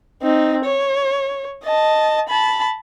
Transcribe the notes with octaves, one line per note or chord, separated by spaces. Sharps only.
C4 D#4
C#5
D#5 A5
A5 B5